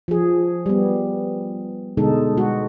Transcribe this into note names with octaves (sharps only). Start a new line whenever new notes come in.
F3 G#4
G3 B3
B2 D3 G#3 D#4 A4
G#3 F#4